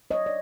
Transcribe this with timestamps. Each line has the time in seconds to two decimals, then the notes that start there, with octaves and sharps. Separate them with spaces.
0.11 F#3 C#5 D#5
0.26 D5